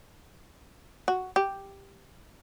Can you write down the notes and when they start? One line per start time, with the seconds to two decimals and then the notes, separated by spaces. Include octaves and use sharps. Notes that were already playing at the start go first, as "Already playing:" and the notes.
1.08 F#4
1.36 G4